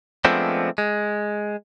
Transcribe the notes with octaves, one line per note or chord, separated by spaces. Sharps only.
F3 G#3 A3 B3 C4 D4
G#3